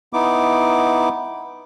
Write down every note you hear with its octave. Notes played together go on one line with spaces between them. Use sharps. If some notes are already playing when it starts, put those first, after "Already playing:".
B3 D#4 E4 D6